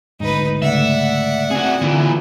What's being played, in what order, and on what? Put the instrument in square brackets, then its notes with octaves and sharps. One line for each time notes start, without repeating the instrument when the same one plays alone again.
[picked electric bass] G#1 D2 G#2 [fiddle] D#4 B4
[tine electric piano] C#3 A3 [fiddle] D5 F#5 [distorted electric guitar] E5
[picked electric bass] C4 [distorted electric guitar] F#4 G#4
[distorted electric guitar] A#2 E3 [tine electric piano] D3